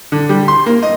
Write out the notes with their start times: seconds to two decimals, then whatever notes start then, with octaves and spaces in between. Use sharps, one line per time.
0.12 D3
0.29 G3
0.48 C6
0.66 A#3
0.83 D#5